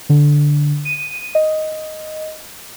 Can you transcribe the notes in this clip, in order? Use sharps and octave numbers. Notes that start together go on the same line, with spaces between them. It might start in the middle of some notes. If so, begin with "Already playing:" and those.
D3
D#7
D#5